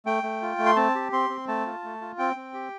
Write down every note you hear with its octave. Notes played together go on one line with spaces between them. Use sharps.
A3 G5
A3
F4
A3
C6
C4 A5
G4
C4 C6
C4
A3 A5
F4
A3
F4
C4 G5
C4
G4